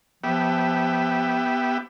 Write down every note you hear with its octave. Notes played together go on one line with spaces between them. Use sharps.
F3 B3 G4 E5